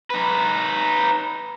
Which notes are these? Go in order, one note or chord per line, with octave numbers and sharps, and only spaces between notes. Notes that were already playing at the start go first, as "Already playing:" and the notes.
D#4 B4